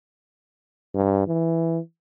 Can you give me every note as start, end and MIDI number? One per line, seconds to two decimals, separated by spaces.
0.95 1.24 43
1.28 1.79 52